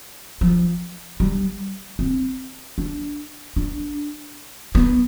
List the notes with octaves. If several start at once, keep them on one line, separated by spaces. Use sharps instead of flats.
F3
G3
C4
D4
D4
B3